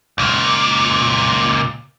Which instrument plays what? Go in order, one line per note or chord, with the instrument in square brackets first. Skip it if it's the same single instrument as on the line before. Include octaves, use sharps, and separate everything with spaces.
[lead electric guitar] C#2 A#2